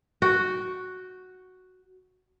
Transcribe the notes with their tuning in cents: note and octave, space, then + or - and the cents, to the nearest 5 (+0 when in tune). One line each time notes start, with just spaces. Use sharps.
F#4 +0 G5 -20